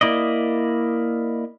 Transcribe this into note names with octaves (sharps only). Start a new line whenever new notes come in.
A#3 E4 D5 D#5